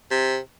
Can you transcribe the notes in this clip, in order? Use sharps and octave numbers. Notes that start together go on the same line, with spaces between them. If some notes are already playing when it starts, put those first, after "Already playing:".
C3